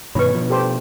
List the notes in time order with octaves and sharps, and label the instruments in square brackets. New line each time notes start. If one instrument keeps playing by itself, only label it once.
[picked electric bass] G2 B2 D#3 [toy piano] B4 B5 [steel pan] C#5 C#6
[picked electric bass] B2 F3
[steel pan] G4 A4 C5